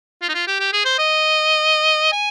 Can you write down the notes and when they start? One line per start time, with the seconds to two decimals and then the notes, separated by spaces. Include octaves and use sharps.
0.22 F4
0.29 D#4
0.34 F4
0.47 G4
0.60 G4
0.73 G#4
0.85 C5
0.98 D#5
2.13 G#5